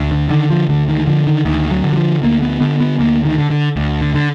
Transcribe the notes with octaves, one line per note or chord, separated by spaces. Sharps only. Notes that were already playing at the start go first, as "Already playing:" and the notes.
Already playing: D2
D3
D3 D#3
F3
D2 D3
D#3
D3 F3
D#3
D2 D#3
F#3
D3
F#3
F3
D2 A#3
B3
D3 B3
B3
D2 A#3
D#3
D3
D3
D2
D3
D3